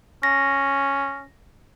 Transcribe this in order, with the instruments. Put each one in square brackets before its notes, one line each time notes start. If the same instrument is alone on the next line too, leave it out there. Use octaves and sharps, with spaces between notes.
[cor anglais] C#4 [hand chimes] A#6